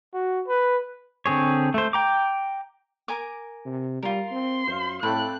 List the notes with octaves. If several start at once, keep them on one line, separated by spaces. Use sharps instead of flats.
F#4
B4
D3 C4 G#4 C#5
A3 C5
G5 A#5 D6
A#4 G#5 D6
C3
G3 F4 A#4
C4 C6
F#2 C5 F5
A2 A3 C4 A4 D5 B5 F#6